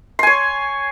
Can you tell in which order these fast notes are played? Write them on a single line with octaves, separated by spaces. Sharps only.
C6 G#5 C#5